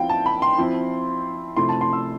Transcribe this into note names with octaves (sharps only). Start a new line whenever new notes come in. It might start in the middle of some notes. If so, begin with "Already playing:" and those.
Already playing: F3 C4 E4 F5 G5
A5
B5
C6
F3 C4 E4
C3 F3 A3 E4 C6
A5
C6
E6